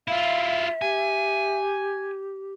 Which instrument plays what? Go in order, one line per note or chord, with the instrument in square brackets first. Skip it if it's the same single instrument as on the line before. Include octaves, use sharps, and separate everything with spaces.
[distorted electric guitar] E4 F4 [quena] E5 [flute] F5
[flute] G4 [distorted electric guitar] G#5